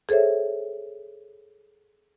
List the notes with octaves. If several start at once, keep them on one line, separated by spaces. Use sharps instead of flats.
G#4 A4 C5 C#5 E5